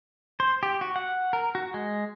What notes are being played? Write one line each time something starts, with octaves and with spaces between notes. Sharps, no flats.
C5
G4
F#4
F#5
A#4
F#4
G#3